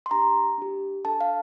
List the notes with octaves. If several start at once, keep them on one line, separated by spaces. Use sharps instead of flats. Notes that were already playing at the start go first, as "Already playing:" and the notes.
C6
D4 G4 A#5
D4 G4
D4 A4 A5
F5